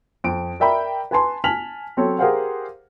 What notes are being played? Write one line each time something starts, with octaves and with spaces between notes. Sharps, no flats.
F2 D7
A#4 D5 E5 G5 A#5 B5
B4 G#5 A5 C6
G#5 A5 F6 B6 F7 F#7
F#3 C4 A4 C#5
G4 G#4 A#4 C5 F5 F#5